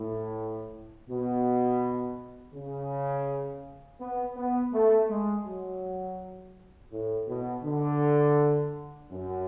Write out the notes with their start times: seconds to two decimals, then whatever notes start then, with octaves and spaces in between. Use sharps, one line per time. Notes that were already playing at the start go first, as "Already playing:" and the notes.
Already playing: A2
1.08 B2
2.53 C#3
4.00 B3
4.36 B3
4.72 A3
5.09 G#3
5.46 F#3
6.91 A2
7.28 B2
7.63 D3
9.10 F#2